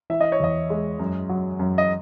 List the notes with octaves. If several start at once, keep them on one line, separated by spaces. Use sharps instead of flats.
E3 E5
D#5
C#5
E2 D#5
G#3
F#2
F#3
F#2
D#5